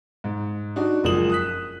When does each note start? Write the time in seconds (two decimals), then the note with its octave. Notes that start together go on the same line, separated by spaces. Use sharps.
0.24 G#2
0.76 D4 D#4 F#4
1.04 F#1 F3 G#3 D#6 E7 F#7
1.30 D#6 F#6 B6